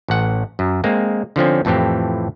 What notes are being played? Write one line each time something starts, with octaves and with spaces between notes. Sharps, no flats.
A1 F#5
F#2
G#3 A#3 C4
D3 F3 C4 C#4
F2 A2 E3 C4 G4